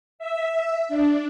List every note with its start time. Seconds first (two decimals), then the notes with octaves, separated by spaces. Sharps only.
0.19 E5
0.89 D4